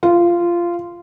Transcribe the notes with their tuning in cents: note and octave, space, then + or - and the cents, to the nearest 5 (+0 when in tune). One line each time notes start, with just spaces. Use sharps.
F4 -15